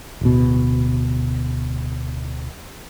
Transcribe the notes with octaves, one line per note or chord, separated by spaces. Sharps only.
D1 B2